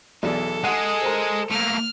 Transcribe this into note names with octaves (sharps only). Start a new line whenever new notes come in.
B1 E2 A4 D5
G#3 G#4 F#5
A#4 C5
A3 A#3 F6